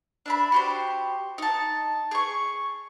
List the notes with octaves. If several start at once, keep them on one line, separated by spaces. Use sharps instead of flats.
D4 E5 B5
F#4 G4 C5
D#4 A5
G#4 C#6